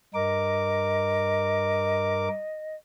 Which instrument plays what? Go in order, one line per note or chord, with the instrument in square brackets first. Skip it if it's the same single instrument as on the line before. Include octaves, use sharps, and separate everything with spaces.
[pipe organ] G2 A#4 D6 [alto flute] D#5